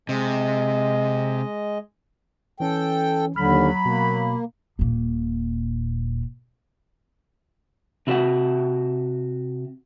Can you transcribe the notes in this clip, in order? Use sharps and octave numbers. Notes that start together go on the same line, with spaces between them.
C3 G#3 D#5
E3 C#4 A4 G5
D#2 D3 F#3 B5 F6
B2 A#3
D#1 A#2
C3 E4 F#4 A#4 E5 F#5